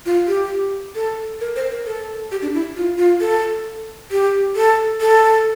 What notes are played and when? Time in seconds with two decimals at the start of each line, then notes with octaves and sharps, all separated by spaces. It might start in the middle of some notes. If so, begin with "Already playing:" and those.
0.06 F4
0.28 G4
0.95 A4
1.41 A#4
1.56 C5
1.71 A#4
1.86 A4
2.31 G4
2.42 D4
2.54 E4
2.76 F4
2.98 F4
3.20 A4
4.11 G4
4.56 A4
5.01 A4